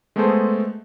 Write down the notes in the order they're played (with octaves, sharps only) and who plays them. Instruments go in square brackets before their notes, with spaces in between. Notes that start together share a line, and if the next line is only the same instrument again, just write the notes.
[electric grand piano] G#3 A3 B3 G#4 A4 C5